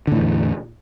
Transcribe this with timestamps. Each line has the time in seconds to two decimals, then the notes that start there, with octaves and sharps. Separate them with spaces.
0.07 D3
0.12 A2
0.16 E3
0.20 E2